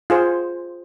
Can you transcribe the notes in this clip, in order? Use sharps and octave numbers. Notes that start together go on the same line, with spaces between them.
F4 G#4 C5